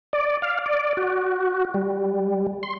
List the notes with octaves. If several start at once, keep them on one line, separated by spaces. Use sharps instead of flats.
D5
F5
D5
F#4
G3
C6